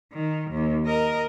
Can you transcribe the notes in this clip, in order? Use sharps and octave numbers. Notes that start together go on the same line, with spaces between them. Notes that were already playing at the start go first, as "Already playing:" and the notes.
D#3
D#2
A#4 D#5